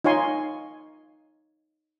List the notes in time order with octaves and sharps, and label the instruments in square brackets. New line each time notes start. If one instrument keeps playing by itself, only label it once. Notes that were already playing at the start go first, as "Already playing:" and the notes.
[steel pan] D#4 F4 C#5 G#5 C6